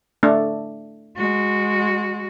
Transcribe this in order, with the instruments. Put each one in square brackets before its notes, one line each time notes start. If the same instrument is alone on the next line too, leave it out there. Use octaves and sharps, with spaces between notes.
[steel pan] A3 D4
[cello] G#3 F#4